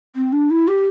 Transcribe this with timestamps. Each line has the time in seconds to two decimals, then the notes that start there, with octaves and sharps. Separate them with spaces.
0.15 C4
0.32 D4
0.50 E4
0.67 G4